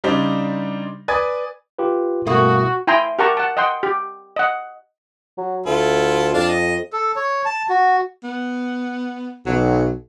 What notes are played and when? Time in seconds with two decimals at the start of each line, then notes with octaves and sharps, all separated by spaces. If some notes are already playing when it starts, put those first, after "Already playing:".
0.04 C#3 G3 D4 D#4 C5
1.08 B4 D5 G#5 D#6 G#6 A6
1.79 F4 G4 B4
2.27 G2 B2 A3 A#3 E4 F#4 D#6
2.87 E4 G5 G#5 A#5 C6
3.19 G4 A#4 F#5 A5 A#5 C#6
3.37 F#5 A5
3.57 D#5 F#5 G5 C6
3.83 G4
4.36 D#5 F#5
5.38 F#3
5.66 D2 E4 F4 A4
6.34 F2 D4 F5 A5
6.49 D#5
6.93 A4
7.16 C#5
7.45 A5
7.69 F#4
8.24 B3
9.46 B1 F#3